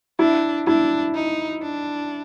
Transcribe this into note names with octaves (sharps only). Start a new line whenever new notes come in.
D4 E4
D4 E4
D#4
D4